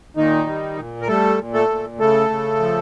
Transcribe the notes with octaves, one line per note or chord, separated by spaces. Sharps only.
A#2 D#3 D#4
G3
A#2
A#4
G3 A3 A4
A#2
A3 A4
A#2
C#3 A3 A4
C#3
F3